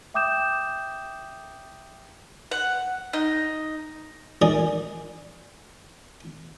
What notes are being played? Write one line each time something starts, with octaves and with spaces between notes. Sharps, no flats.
E5 G5 D6 D#6 G6 E7
F#5
D#4
D#4 G#4 A#4 D5